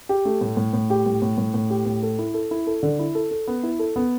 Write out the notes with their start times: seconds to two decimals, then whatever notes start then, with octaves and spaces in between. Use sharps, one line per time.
0.09 G4
0.25 A3
0.41 A2
0.57 A2
0.73 A2
0.90 G4
1.06 A2
1.22 A2
1.38 A2
1.54 A2
1.70 G4
1.86 A2
2.03 A4
2.19 E4
2.34 A4
2.51 E4
2.67 A4
2.83 D3
2.99 E4
3.15 A4
3.31 A4
3.47 B3
3.63 E4
3.79 A4
3.96 B3